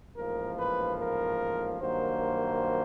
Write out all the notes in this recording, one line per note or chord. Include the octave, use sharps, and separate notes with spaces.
A1 G#2 F3 A#3 A#4
B4
A#4
G2 D#3 F#3 A#3 C5